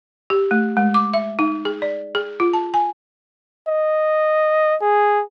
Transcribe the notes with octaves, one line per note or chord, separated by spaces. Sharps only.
G4
A3
G#3
D6
E5
D#4
G#4
D5
G#4
F4
A5
G#5
D#5
G#4